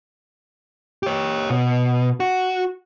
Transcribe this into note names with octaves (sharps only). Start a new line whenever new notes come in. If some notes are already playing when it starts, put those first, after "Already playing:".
G4 C#5
B2
F#4